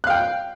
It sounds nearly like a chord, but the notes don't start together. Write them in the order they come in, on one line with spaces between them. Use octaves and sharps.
F#6 F5 G5